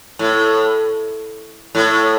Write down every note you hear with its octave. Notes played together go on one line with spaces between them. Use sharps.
A2
A2